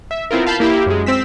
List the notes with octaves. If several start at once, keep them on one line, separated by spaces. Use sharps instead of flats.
E5
B3 C4 E4 F4 A#4
F5 A5 B5 G6 C7
A#3 E4 G4
F#2 G#3
C4 E6 B6